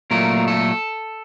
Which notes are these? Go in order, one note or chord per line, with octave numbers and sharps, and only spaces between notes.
A#2 F#3 A3 A#4
A4